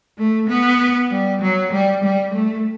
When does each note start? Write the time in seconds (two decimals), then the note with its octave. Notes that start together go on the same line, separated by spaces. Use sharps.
0.19 A3
0.49 B3
1.11 G3
1.42 F#3
1.72 G3
2.04 G3
2.34 A3